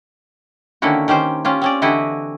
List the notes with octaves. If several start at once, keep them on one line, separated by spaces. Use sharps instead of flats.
D3 D#3 A#3 C#4 E4 F#4
D#3 C#4 G4 C5
C#4 F4 G4
C4 C#4 D5
D3 E3 E4 F#4 G4 D#5